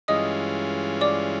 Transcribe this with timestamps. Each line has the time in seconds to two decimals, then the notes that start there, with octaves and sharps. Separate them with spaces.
0.08 G2 E3 G#3 C#4 F4 D#5 D#6
1.01 D5 D6